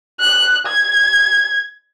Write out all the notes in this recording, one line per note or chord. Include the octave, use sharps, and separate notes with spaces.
F#6
G#6